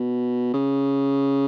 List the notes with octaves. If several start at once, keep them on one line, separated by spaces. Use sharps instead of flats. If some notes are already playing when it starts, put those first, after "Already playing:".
Already playing: B2
C#3